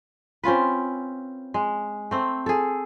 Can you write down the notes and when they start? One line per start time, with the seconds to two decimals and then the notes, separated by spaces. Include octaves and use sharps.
0.44 C4 C#4 F4 B4
1.54 G#3
2.11 A3 C4
2.46 G#4 A4